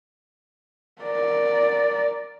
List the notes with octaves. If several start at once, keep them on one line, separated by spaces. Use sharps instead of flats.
A#4 D5